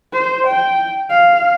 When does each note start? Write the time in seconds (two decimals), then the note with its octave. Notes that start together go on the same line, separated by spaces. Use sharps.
0.13 C5
0.47 G5
1.10 F5